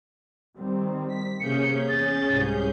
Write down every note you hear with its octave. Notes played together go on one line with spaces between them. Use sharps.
D#3 G3 C4
B6
C3 A#3 C#4 G#4 G6 C#7
E2 A6
C2 G#2